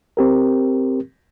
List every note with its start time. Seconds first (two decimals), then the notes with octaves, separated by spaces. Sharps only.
0.17 C4 G4 A#4